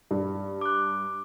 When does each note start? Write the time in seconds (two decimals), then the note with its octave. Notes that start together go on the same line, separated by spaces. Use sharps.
0.11 G2
0.61 D6 F#6